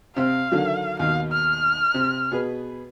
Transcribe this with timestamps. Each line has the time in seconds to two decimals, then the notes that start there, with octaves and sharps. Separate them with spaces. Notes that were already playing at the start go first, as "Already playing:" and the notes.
0.17 C3 C4 F5
0.52 D3 D#3 F#3
0.99 D#2 B2 D#4 F5
1.32 F6
1.94 C3
2.32 B2 G#4 B4